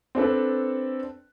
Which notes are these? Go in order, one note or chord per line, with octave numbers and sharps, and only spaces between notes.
C4 D4 A4 B4